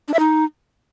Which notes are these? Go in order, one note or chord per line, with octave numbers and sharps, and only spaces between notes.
D4
E5
D#4